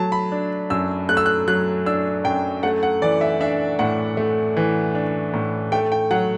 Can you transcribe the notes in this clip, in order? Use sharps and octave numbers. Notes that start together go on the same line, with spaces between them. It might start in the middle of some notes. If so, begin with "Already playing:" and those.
Already playing: F#3 A3 A5
B5
D4
F#2 E6
A3 F#6
E6
F#6
F#3 F#6
D4 E6
F#2 G5
A3 F#5
F#5
E3 D5
E5
D4 E5
A2 F#5
A3
E3
D4
A2
A3 G5
G5
F#3 F#5